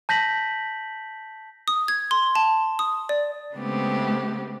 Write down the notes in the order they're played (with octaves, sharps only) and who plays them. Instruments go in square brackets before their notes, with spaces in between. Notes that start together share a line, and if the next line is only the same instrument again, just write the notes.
[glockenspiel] A5 G6 A#6 B6 F#7
[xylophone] D#6
G#6
C6
A5
D#6
D5
[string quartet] C#3 G#3 A3 B3 C4 G4